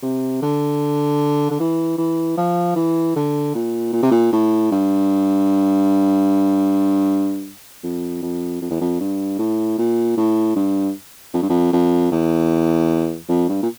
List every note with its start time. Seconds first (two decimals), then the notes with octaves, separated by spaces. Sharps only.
0.03 C3
0.42 D3
1.50 D3
1.60 E3
1.98 E3
2.37 F3
2.76 E3
3.16 D3
3.55 A#2
3.93 A#2
4.02 C3
4.11 A#2
4.33 A2
4.71 G2
7.84 F2
8.22 F2
8.61 F2
8.70 E2
8.81 F2
9.00 G2
9.39 A2
9.78 A#2
10.17 A2
10.56 G2
11.34 F2
11.42 G2
11.49 F2
11.73 F2
12.12 E2
13.29 F2
13.49 G2
13.62 A#2